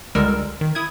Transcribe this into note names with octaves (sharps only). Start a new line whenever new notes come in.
C#2 D3 G3 G#3 A#4 E6
D#3
E4 D#6 G#6